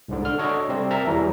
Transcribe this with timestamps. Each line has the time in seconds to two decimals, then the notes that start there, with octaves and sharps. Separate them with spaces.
0.08 C2 G#2 D3
0.22 D3 F6
0.38 D4 F#4 A4 C#5 D#5
0.69 C3 G3 C4 G4
0.90 A#4 E5 A5 A#5
1.07 E2 E3 F#3 G3